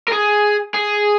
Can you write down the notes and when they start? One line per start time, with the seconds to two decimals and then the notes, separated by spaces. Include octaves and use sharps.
0.08 A#4
0.12 G#4
0.74 G#4